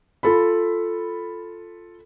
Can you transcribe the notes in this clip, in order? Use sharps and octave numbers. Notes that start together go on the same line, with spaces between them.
F4 A4 B5